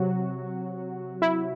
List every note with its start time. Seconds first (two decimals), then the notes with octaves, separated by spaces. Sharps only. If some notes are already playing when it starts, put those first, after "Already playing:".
Already playing: C3 F#3 F#4
1.22 E4